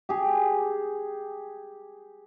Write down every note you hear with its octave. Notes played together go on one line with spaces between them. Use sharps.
G4 G#4